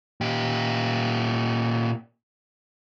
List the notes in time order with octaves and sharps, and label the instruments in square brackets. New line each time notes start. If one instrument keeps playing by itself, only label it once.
[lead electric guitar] A#2 G4